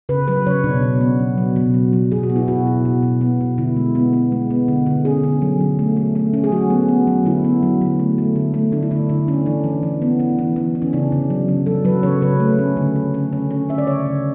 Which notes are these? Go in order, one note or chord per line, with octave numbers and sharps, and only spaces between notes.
C#3 B4
F#3 B4
C#3 C#5
B2 D4
B2
B3
F#3
F#3
B2
F#3
F#3
B2 G#4
F#4
B3
E4
B2 F#4
B2
B2
B2
B3
B2
D3 E4
G#3
B3
B3
G#3
B3
D3
D3
C#4 G#4
D3
F#3
D3
A3
A3
A3
C#4
G#4
F#3 F#4
B3
B3
F#3
D3 E4
B3
F#3
D3
A3
A3
D3
A3
D3 D4
E4
D3 D4
D3
C#4
E3 D4
E3
E3
B3
E3
E3
E3
E3
C#4
C#3 D4
C#3
F#3
C#3
F#3 A4
F#3 B4
C#3 C#5
C#3 B4
A3
C#4
D3
D3
C#4
C#4
C#4
D3 E5
D5
C#3 C#5
C#3